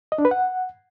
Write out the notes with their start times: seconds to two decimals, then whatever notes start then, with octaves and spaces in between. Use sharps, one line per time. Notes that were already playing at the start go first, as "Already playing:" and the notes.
0.12 D#5
0.18 D4
0.25 B4
0.31 F#5